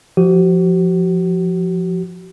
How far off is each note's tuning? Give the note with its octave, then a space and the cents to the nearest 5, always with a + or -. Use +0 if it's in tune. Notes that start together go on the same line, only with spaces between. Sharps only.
F3 +5 F#4 +45